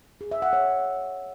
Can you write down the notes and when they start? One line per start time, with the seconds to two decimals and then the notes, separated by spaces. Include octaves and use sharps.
0.21 G#4
0.31 E5
0.42 F#5
0.53 C#5